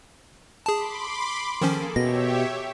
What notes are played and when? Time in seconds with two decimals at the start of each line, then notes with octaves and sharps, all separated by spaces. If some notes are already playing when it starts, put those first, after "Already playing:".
0.66 G#4 A5 B5 C6 D6
1.61 D#3 F3 A#3 C#4 G#4 A4
1.96 B2 G4 C#5 E5 A#6